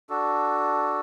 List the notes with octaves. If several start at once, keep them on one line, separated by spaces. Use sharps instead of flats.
D4 F#4 A4